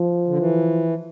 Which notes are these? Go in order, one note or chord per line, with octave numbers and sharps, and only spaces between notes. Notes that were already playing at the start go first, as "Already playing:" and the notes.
Already playing: F3
D3
E3